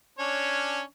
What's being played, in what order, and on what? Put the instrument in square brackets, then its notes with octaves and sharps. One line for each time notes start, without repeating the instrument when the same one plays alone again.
[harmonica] C#4 D4 C#5